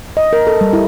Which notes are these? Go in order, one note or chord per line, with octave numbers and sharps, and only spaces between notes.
D#5
A#4
A4
G3
E4